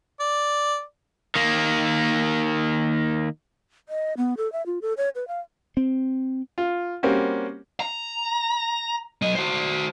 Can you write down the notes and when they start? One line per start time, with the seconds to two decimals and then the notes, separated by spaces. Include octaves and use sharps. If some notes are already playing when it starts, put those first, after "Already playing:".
0.20 D5
1.35 D#3 A#3
3.89 D#5
4.17 B3
4.37 A4
4.52 E5
4.66 F4
4.82 A4
4.97 C#5
5.15 B4
5.28 F5
5.77 C4
6.58 F4
7.03 G3 A#3 C4 C#4 F#4
7.80 A#5
9.22 F#3 D#5
9.35 F#4 C5